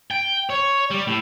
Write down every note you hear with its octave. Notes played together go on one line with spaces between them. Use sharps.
G5
C#5
G3
A2